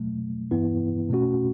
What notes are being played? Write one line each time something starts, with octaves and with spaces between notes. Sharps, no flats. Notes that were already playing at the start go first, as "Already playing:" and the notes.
Already playing: B2 F#3 A3
G2 E3 B3 E4 B4
B2 A3 C#4 F#4